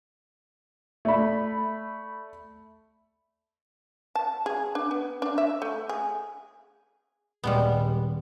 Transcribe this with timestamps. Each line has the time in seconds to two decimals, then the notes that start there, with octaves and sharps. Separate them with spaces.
1.05 A3 D5 B5
4.15 A5
4.46 G#4
4.75 D4
4.91 B3
5.22 D4
5.38 E5
5.62 A3
5.89 G#4
7.44 D#1 G3 G#3 B3